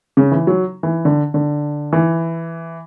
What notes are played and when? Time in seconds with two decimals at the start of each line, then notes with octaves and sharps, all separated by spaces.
0.17 C#3
0.32 E3
0.47 F#3
0.83 E3
1.05 D3
1.34 D3
1.93 E3